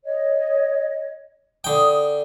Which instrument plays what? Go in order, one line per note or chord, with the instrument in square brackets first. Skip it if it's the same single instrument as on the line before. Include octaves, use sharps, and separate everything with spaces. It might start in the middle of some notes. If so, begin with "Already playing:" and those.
[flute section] C#5 D#5
[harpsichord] D3 G5 [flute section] D#6